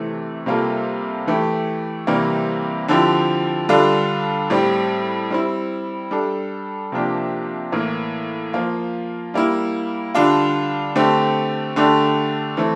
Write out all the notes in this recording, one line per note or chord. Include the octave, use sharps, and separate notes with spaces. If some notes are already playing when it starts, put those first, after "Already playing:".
Already playing: C3 E3 A3
C3 G3 A#3 F4 A4
E3 A3 E4 G4
C3 E3 G3 A#3
D3 F3 C4 E4 G4
D3 G3 D4 F4 A4
A2 G3 C4 G4
G3 C4 E4
G3 D4 A4
C3 F3 A#3 D4 G4
A2 E3 A#3
F3 A#3 F4
G3 A#3 E4
D3 G3 D4 F4
D3 A3 C4 G4
D3 A3 D4 G4
E3 A3 C4